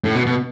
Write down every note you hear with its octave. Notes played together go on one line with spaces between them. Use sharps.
A2
B2
B2